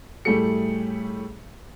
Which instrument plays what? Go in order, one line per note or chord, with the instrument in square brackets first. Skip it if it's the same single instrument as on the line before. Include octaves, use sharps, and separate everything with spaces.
[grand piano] A2 G3 A3 G#4 A4 C#7